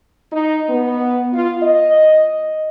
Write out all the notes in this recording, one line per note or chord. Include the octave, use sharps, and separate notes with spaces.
D#4
B3
F4
D#5